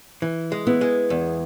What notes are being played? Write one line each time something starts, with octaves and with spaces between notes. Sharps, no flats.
E3
G#3
B3 E4
G#3
E2